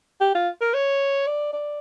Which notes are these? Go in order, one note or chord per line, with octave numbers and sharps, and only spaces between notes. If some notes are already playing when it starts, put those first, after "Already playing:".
G4
F4
A#4
C#5
D5
D5